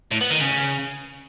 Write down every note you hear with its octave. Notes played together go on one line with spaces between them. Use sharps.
A2
B3
D#3
C#3